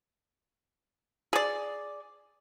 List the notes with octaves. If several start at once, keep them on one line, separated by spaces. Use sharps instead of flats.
G#4 D5